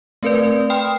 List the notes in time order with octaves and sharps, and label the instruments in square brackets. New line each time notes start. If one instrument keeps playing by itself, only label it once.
[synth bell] A3 C4 A#4 B4 D5
G5 B5 C6 D#6 F6